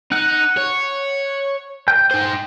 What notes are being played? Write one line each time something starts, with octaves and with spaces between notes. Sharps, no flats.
D#4 F#5
C#5
G5 G6
D#4 C5